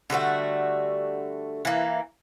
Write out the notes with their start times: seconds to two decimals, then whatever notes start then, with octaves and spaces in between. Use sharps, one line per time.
0.10 D3 G3 A3 F#4
1.65 E3 A#3